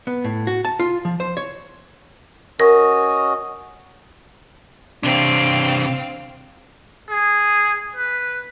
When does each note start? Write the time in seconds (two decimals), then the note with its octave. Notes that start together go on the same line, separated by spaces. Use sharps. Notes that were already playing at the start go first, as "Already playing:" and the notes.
0.07 B3
0.24 A2
0.47 F#4
0.65 A5
0.80 F4
1.05 F3
1.20 C5
1.37 C#5
2.60 C#4 F#4 A#4 D#5
5.03 C3 C4 D4 F5
7.10 G#4
7.96 B4